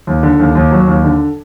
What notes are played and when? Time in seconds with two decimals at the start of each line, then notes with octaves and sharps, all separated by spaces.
0.07 D#2
0.23 D3
0.39 D#2
0.55 D#2
0.71 F#3
0.87 D#2
1.04 D3